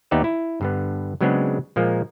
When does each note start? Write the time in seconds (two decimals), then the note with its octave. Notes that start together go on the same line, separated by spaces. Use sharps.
0.11 D#2 B3 D#4 G4 D5 E5
0.24 E4
0.61 G2 D3 B3
1.21 C#3 F#3 G#3 B3 C4 D4
1.76 A#2 F3 G#3 A#3